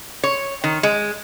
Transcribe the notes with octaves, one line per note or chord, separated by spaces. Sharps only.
C#5
D#3
G#3